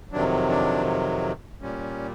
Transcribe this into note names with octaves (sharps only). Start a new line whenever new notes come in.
F2 C3 D#3 F#3 D4
D4
A#2 G3 C#4